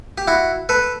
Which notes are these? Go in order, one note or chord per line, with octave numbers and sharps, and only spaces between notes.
G4
E4 F#4
A4 B4